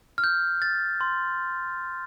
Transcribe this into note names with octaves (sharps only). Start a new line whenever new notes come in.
F6
G6
A6
C6